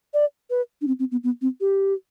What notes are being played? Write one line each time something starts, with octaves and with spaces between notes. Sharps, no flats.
D5
B4
D4
C4
C4
B3
B3
C4
G4